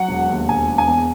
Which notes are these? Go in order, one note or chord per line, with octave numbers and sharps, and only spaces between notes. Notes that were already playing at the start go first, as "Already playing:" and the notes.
Already playing: F#3 F#5
E1
D#2
E1 G#5
E1
G#5
E2